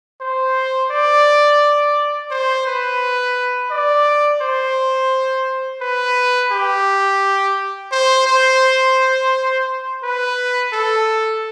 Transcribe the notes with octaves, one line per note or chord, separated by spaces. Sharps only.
C5
D5
C5
B4
D5
C5
B4
G4
C5
C5
B4
A4